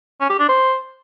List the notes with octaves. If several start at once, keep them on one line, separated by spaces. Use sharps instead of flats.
C#4
G4
D4
C5